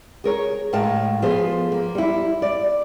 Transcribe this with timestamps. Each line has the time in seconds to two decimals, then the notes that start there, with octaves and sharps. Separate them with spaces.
0.24 G#4 A#4 C#5
0.73 A2 G#3 A#3 A#4 A5
1.22 F3 B3 F4 G#4 A4 C5
1.72 A#3
1.95 G3 E4
2.42 D5